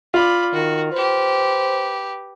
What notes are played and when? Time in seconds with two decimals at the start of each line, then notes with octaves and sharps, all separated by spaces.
0.14 F4 D5 B5
0.54 D#3 F#4
0.92 G4 B4 C5